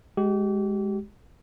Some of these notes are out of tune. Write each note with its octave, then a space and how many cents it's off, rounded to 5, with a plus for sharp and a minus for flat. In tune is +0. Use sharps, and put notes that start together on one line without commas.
G#3 +0 G4 -35